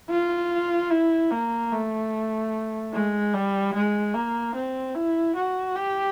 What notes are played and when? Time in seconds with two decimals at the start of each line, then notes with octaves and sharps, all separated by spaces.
0.10 F4
0.91 E4
1.31 A#3
1.72 A3
2.94 G#3
3.34 G3
3.74 G#3
4.14 A#3
4.55 C4
4.95 E4
5.36 F#4
5.75 G4